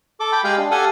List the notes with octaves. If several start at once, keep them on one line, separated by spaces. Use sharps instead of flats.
A4 D6
G5 B5 D6
G#3 G4 G#4 F5 G5
D4
G4 A4 F5 F#5 G#5